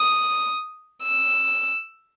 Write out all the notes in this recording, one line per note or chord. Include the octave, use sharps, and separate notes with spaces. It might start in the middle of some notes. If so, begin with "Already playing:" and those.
Already playing: D#6
E6